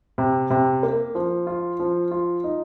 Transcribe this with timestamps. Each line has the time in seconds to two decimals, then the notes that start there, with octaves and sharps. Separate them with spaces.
0.18 C3
0.50 C3
0.83 A#3
1.15 F3
1.47 F4
1.80 F3
2.11 F4
2.44 D#4